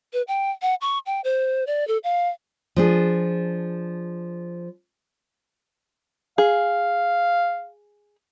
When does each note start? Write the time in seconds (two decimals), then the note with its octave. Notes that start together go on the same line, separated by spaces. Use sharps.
0.13 B4
0.28 G5
0.62 F#5
0.81 C#6
1.06 G5
1.24 C5
1.67 D5
1.88 A4
2.04 F5
2.76 F3 D4 G#4
6.38 G#4 F5